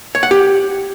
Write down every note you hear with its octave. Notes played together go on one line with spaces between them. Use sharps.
C#5
F#5
G4